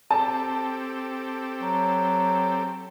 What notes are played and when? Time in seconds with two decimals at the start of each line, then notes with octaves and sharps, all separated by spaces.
0.10 C4 G4 A4 A5
1.62 F#3